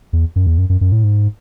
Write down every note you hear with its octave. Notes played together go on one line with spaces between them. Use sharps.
E2
F#2
E2
F#2
F#2
F#2
A2
G#2